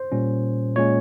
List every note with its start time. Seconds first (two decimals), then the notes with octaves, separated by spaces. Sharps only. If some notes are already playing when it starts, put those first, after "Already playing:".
Already playing: C5
0.12 A#2 G3 C#4
0.76 A#2 G#3 C#4 C#5